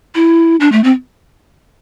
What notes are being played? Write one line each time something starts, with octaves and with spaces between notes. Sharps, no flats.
E4
D4
A3
C4